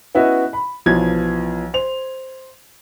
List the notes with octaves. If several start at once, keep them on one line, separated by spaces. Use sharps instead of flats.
B3 C#4 E4 F#4 D#5 E5
B5
B1 E3 F3 G#6
C5 F7